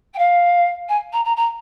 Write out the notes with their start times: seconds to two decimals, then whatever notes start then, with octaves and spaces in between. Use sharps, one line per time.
0.13 G5
0.18 F5
0.88 G#5
1.12 A#5
1.24 A#5
1.36 A#5